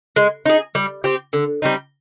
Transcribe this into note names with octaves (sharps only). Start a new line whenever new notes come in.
G#3
D#4 G#4
G3
C4 G4
D3
G3 C4 D#4